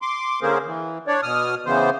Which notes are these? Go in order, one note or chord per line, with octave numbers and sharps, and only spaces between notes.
C6 D6
D3 A#3 C#4 G#4 A#4 C5
E3
D4 C#5 D5
B2 D#6 F6
C#3 E3 B3 C5